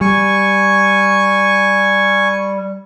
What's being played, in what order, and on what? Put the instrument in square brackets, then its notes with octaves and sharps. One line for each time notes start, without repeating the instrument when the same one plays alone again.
[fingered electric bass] G3 [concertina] G#5 C#6